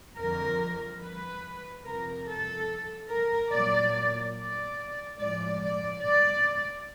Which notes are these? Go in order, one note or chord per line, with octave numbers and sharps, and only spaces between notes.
F2 D3 F3 A#4
B4
F2 C3 F3 A#4
A4
A#4
A#2 F#3 A#3 D5
D5
A2 F3 G#3 D5
D5
D5